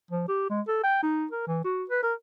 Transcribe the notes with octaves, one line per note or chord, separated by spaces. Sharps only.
F3
G4
G#3
A4
G5
D#4
A#4
E3
F#4
B4
A#4